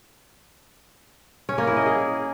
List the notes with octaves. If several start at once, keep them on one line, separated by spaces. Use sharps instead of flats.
C#4
A#3
E4
D#5
G#4